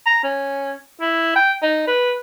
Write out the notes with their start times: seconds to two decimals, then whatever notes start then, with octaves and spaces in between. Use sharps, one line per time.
0.06 A#5
0.24 C#4
1.01 E4
1.36 G5
1.62 D#4
1.87 B4